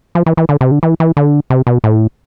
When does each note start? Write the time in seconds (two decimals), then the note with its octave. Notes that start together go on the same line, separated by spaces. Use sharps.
0.15 F3
0.26 E3
0.37 E3
0.49 D3
0.61 C3
0.71 D3
0.83 E3
1.00 E3
1.17 D3
1.50 C3
1.67 B2
1.84 A2